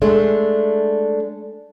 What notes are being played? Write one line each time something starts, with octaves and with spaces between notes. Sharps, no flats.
G#3 A3 D4